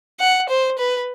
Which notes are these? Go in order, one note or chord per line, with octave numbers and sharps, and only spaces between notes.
F#5
C5
B4